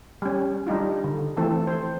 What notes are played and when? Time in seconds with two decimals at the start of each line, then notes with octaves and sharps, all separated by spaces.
0.22 G3 C#4
0.67 G3 D4 D#4 F4
1.04 D3
1.37 E3 F3 A3 C4 A4
1.67 C5